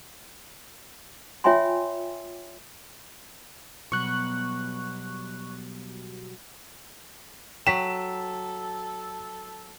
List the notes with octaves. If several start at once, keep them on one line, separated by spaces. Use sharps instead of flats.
F4 C#5 E5 G5 G#5 C6
B2 F#3 G3 C#6 F#6
F#3 A4 G5 B6 E7